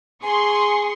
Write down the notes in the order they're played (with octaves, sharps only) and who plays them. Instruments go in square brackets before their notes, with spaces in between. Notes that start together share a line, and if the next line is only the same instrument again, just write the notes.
[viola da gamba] G#4 [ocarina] G#5 [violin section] C6 C#6 D#6